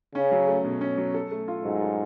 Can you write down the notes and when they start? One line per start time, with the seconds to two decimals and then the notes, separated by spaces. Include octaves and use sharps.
0.15 C#3 C#4
0.32 F#3
0.48 A3
0.64 B2
0.81 C#4
0.97 F#3
1.14 A4
1.31 A3
1.48 F4
1.64 G#2 F#3
1.81 A4